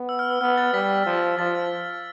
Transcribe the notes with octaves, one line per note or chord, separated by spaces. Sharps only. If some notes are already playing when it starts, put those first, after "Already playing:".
Already playing: B3
E6
F6
E6
B3 F6
A6
G3 B6
F3
F3 A6
F6